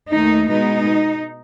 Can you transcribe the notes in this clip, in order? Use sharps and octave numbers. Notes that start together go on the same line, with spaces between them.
D#2 D#3 A3 D#4
B2 G#3 B3 D#4